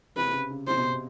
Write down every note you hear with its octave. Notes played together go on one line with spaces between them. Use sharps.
C3 B4
C#3
C#3
C3 C5
B2
B2